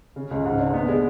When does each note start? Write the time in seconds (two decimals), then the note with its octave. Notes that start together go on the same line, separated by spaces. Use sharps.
0.16 C#3
0.31 C#2
0.45 G#2
0.59 D4
0.74 B3
0.89 G#3